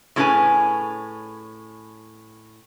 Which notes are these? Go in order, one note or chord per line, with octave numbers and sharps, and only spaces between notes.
A2 F#3 C#4 G#4 B4 G#5